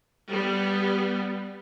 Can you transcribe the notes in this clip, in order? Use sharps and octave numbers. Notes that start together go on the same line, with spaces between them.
G3 B3